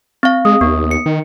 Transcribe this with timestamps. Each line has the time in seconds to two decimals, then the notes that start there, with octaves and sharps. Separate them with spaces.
0.23 C4 F5
0.45 G#3 D#6
0.61 D#2 B3
0.91 C#7
1.06 D#3